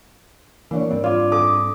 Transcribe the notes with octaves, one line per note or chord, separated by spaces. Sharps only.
E3 A#3 D4 C#5
G#2 G3 C4 D4
F4 D5 D6
A4 D6 D#6